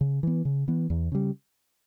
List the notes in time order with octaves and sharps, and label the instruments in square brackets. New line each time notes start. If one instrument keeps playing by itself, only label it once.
[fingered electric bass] C#3
E3 B3
C#3
E3 B3
E2
C#3 G3